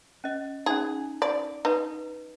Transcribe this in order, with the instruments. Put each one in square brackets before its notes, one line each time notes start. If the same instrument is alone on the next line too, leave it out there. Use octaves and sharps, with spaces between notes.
[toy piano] C#4 D#5
[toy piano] C#4 D#4 [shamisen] G#4
[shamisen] D5
[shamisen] D#4 [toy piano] B4